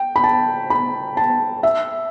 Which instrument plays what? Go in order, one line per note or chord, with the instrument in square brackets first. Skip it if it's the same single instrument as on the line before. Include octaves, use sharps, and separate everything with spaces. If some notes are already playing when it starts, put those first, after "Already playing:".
Already playing: [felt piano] G5
B5
A5
B5
A5
E5